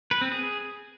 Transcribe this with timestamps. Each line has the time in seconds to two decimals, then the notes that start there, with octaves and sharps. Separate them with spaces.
0.11 B4
0.21 C4
0.32 G#4